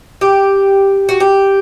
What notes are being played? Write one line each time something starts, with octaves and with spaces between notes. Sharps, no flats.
G4
F#4
G4